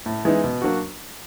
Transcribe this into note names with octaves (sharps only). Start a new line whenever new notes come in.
A2
E3 G#3 B3 D#4
B2
F#3 A#3 D4 F#4